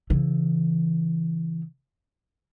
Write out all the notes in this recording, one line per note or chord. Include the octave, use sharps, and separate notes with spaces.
C#3 E3